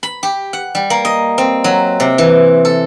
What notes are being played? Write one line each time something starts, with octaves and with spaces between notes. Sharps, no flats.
B5
G4
F#5
G3
A#3
D#5
C4
F#3
C3
E3
A4